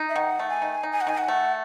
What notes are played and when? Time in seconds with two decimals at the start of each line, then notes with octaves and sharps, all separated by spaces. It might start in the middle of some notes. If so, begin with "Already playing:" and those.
Already playing: D#4
0.09 E5
0.16 D#3 F#5
0.39 A3
0.50 G#5
0.62 D#3
0.83 D#4
0.92 G#5
1.01 F#5
1.07 D#3 G#5
1.18 F#5
1.28 A3